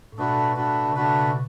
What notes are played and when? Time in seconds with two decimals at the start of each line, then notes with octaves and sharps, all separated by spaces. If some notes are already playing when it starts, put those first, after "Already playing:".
0.12 A2
0.18 B2 A3 D4 F#4 B4
0.56 A3 D4 F#4 B4
0.85 C#3
0.95 B2 A3 D4 F#4 B4
1.08 C#3
1.21 B2